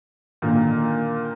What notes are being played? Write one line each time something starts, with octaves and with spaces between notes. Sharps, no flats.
A#2 D3 D#3 A#3